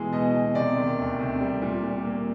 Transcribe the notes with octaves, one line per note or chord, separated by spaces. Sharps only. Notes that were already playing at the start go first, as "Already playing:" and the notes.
Already playing: B2 E3 G#3
B2 D#5
B2
C3 D5
D#3
D2
C3
G3
A#2
A#2
A#3